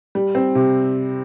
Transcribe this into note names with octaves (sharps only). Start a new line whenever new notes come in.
G3
C4
C3